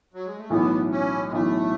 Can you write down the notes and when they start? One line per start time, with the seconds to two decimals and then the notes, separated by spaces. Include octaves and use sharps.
0.14 F#3
0.26 G#3
0.38 A3
0.50 B1 A2 E3 B3
0.91 C#4
1.27 G#3
1.32 B1 A2 E3 A3